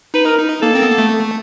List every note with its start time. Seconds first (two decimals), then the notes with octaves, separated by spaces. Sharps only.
0.14 D#4 B4
0.25 A#4
0.38 D#4
0.62 A#3 A4
0.75 C4
0.82 B3
0.90 A#3
0.98 A3